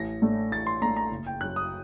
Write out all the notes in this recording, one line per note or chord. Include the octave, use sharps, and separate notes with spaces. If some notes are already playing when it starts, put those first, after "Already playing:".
Already playing: A1 A#6
A2 A3 D4
A1 A6
C6
A2 A3 D4 A#5
A#5
F#1
G5
F#2 F#3 F#6
D#6